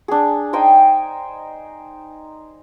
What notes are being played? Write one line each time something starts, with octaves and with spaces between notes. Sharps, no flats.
D4 G#4
D#4 C5 G5 G#5